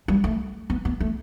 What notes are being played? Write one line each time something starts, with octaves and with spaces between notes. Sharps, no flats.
G3
A3
B3
B3
A3